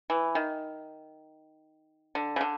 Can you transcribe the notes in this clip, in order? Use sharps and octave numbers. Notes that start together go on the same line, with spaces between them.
E3
D#3
D3
C#3
D3